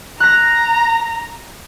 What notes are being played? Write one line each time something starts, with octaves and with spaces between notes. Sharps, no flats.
A#5 F#6 A#6